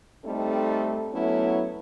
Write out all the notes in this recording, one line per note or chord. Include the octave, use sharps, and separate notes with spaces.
G3 A3 C4 D#4 A4
F#3 A3 B3 C#4 E4